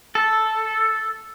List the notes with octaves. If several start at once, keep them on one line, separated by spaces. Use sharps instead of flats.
A4